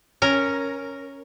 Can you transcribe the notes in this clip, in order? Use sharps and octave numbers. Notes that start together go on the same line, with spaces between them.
C#4 A#4